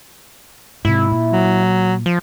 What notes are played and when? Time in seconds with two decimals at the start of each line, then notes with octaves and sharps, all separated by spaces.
0.85 G#2 C3 E4
1.11 A#2
1.32 F#3
2.06 F3